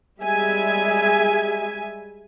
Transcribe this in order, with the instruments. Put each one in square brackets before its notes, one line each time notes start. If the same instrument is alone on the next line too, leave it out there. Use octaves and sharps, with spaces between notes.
[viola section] G3 G#3 E5 G#5